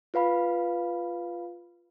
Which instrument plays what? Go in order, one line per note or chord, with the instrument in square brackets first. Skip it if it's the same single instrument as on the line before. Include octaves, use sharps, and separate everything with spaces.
[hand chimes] F4 B4 F5 B5